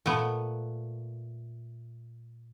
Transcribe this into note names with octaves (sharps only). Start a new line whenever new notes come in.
A#2 A3 B3